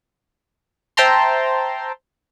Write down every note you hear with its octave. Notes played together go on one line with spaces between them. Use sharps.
C5 E5 G5 A5 A#5 C6